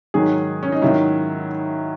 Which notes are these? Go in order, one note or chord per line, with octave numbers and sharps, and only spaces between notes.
G#2 D#3 F#3 G#4
C#4
D#4
G#2 D#3 F#3 E4